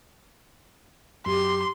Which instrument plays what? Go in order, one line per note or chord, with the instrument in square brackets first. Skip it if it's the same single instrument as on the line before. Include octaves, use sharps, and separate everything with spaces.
[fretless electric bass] F#2 [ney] G4 [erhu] C6